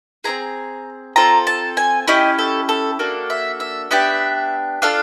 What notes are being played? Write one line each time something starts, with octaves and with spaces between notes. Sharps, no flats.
C4 E4 G#4 A#5
C4 F4 A4 A#5
A5
G#5
C#4 E4 G4 D#5
A4
A4
A#3 D4 F#4 A4
E5
E5
B3 D4 G4 E5
D4 F4 A4 F5